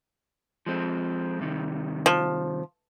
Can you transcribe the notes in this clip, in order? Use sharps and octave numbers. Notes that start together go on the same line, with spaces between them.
F3 G#3 C4
G2 C3 D#3
F3